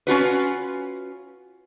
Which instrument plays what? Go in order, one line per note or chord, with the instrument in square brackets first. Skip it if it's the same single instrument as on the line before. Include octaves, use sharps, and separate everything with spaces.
[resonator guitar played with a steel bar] C#4 F4 F#4 B4